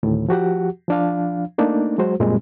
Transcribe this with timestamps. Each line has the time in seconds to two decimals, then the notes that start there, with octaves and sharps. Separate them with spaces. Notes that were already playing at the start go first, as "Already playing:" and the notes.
0.03 D2 A2 D#3
0.29 F3 F#4 G4 F#5
0.88 F3 D4 F5
1.58 A3 A#3 D4 D#4
1.98 F#3 G#3 F#4 C5
2.20 F#2 A#2 G3 G#3 C4